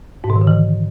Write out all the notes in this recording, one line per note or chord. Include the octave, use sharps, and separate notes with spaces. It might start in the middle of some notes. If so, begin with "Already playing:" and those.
G#2
B2
D#3
D3
E3